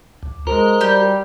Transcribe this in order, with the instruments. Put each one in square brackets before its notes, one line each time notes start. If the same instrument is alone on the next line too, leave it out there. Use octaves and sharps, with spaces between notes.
[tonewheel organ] D2
[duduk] G#3 [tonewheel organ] F#4 C5 [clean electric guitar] A#4
[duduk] G3 [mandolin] G4